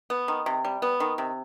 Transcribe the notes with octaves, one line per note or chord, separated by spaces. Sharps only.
B3
D#3
C3
G3
B3
D#3
C3